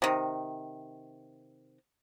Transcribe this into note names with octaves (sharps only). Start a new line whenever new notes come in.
C3 D#3